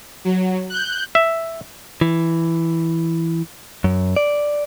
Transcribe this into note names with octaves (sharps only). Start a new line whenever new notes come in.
F#3
F#6 G6
E5
E3
F#2
D5